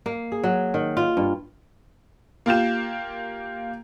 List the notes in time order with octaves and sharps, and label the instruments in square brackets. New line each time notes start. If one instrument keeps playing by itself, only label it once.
[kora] A#3
G#4
F#3
D#3
F4
G2
[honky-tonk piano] A#3 F4 G4 E7